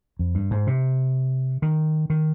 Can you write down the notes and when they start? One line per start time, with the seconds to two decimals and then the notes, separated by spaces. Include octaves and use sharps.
0.19 F2
0.35 G2
0.51 G#2
0.67 C3
1.62 D#3
2.10 D#3